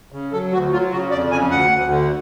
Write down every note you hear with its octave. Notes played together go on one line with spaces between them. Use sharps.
C#3
F#3 A4
D2 F#4
F#3 F4
C#3 F#4
F2 D5
C#3 G#5
D2 F#5
D2
D3